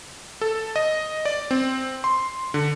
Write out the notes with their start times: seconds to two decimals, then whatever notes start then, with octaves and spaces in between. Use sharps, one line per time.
0.41 A4
0.76 D#5
1.25 D5
1.51 C4
2.04 C6
2.54 D3